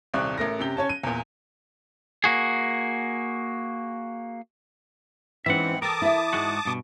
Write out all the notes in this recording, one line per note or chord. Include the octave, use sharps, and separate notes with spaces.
D#1 C2 C4 D5 C#6 F#6
A1 A3 A#4 A#6
F#2 C3 G4 G7
C#4 C#5 A5
D#7
E2 A#2
A#3 F#4 G#4
G#2 E3 C4 C#4 E5 F#5
A4 A#4 G5 A5 D6 D#6
E4 E5
G#2 G#3 F#4
G2 B2